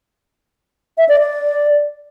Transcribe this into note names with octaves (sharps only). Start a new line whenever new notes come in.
E5
D5
D5